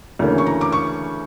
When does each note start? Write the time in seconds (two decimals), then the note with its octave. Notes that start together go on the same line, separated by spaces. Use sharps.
0.19 D2 C#3 E3 A#3 C#4
0.38 C#6
0.46 A#5
0.61 D6
0.72 C#6